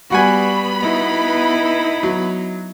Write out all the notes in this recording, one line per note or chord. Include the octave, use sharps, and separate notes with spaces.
G3 B3 F#4 F#5 G#5 B5
D#4 E4
F#3